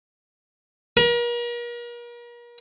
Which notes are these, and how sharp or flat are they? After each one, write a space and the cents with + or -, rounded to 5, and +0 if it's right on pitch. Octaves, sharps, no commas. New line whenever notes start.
A#4 +40